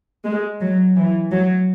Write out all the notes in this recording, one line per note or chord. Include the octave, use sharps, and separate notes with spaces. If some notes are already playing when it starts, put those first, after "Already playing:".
G#3
F#3
E3
F#3